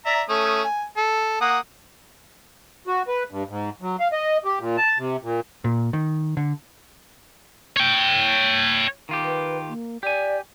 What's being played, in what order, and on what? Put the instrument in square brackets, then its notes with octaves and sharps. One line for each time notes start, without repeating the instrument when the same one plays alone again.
[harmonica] D5 E5 A#5
A3 C#4 D#6
G#5
A4
A#3 F#5 D#6
[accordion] F#4
B4
G2
G#2
F#3
F5
D#5
G4
A#2
A5
C3
A#2
[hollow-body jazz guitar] A#2
D#3
D3
[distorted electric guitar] C#5 G5
[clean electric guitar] D#3 F4 G4
[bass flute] B4
A#3
[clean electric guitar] G4 G#5 [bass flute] D5